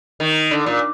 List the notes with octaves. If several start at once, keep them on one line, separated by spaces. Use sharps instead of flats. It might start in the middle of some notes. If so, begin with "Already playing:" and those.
D#3
D3
A#2